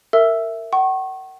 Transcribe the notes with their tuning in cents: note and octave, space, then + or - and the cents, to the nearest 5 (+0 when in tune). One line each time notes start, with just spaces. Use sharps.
A#4 -25 E5 +0 E6 +0
F#5 +45 C#6 -30